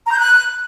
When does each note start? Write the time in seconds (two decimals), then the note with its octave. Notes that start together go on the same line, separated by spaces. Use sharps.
0.05 A#5
0.11 G6
0.17 F#6